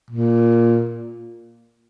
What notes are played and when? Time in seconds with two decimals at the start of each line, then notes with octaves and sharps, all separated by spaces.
0.11 A#2